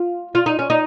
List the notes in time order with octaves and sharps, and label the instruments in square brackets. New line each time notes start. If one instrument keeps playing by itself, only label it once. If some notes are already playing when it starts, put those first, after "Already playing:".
Already playing: [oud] F4
F4
D#4
C#4
D#4